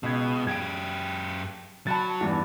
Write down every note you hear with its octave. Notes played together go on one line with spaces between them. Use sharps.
C#2 B2 G#6
F#2 G4 G#6 D7
F#3 A5 B5 A6
E2 G2 E3